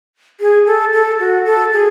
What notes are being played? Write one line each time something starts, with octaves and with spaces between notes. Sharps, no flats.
G#4
A4
A4
F#4
A4
G#4